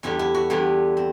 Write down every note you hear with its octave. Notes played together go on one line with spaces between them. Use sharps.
E2 D3 G3 B3 E4
E4
F#4
E2 D3 G3 B3 E4
C4